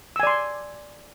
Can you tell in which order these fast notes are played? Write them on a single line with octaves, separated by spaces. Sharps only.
E6 G#5 D5 C6